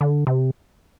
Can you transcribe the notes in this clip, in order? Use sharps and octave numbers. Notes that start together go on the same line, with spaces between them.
D3
C3